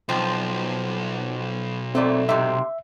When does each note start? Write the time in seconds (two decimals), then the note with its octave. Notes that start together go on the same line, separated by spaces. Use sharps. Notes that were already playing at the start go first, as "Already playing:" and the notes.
0.09 B1 F3 C4
1.95 F2 A#2 A3 C4 D5
2.29 G#2 C3 E5